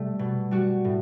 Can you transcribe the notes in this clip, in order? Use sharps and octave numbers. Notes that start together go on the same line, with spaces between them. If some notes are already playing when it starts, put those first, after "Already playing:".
Already playing: C3 G3 A3
B2
G3 F#4
A2